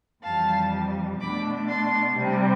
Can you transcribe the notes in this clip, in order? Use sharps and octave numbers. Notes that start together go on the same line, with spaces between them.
F2 E3 G3 F5 A5
B2 A3 D4 B5 D6
A5 C6
C3 G3 C4